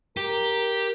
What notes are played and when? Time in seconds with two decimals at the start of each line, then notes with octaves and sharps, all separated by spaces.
0.17 G4 A#4